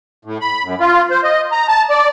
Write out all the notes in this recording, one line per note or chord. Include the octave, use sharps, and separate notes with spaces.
A2
B5
F#2
F4
C5
D#5
A#5
A5
D5